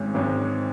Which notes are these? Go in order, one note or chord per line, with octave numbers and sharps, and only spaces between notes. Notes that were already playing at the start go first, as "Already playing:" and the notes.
Already playing: G#1 G#2 G#3 C#4
G#1 G#2 G#3 C#4